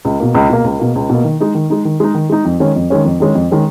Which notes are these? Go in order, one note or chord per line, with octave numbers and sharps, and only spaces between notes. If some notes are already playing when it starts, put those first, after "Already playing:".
C#2
B2 A#3
C#2
B2 A#3
C#2
B2 A#3
C#2
B2 A#3
D#3
G#3 D#4
D#3
G#3 D#4
D#3
G#3 D#4
D#3
G#3 D#4
F2
D#3 G#3 C#4
F2
D#3 G#3 C#4
F2
D#3 G#3 C#4
F2
D#3 G#3 C#4